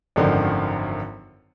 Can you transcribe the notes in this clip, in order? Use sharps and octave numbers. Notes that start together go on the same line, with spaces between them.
G#1 F#2 D3 D#3 F3